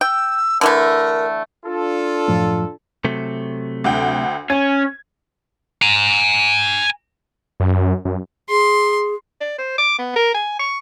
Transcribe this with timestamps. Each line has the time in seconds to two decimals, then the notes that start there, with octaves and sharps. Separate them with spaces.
0.01 G5 E6
0.61 D3 E3 A3 A#4
1.66 D4 F4 A4
2.28 F#2 A2 F3
3.04 C3 F#3 A3
3.84 D2 F#5 G5
4.50 C#4 G#6
5.82 G#5 A#5
7.60 F#2
8.05 F#2
8.50 G#4 C6
9.41 D5
9.59 C5
9.78 D6
9.99 B3
10.16 A#4
10.34 G#5
10.59 C#6